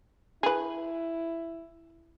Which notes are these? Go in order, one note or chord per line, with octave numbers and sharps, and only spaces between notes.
E4 G#4 B4